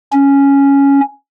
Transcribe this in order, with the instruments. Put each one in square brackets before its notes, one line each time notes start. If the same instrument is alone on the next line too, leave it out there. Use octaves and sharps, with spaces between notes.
[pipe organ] C#4